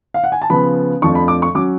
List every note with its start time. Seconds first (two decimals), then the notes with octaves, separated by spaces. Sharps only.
0.14 F5
0.24 F#5
0.32 G#5
0.42 A5
0.50 C#3 F3 B3 B5
1.02 F2 F3 A3 D4 C#6
1.15 B5
1.28 D6
1.42 C#6
1.55 F#3 C#4 D6